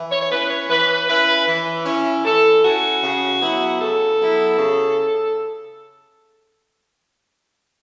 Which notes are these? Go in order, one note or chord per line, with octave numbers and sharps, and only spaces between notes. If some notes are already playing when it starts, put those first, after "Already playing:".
Already playing: E3
C#5
C#5
C#4 E4 B4
C#5
E3 B4
C#4 E4 B4
E3
C#4 E4
E3 A4
C#4 E4 F#4
C#3
F#3 B3 E4
C#3 A4
F#3 B3 E4
C#3